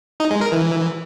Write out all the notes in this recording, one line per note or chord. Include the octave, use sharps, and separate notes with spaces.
D#4
G#3
A#4
E3